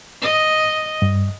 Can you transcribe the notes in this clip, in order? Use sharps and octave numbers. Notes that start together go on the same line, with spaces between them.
D#5
G2